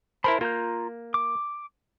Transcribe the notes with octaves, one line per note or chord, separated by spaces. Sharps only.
E4 A#4 C5 A5 B5
A#3 F4 A#5 G6
D6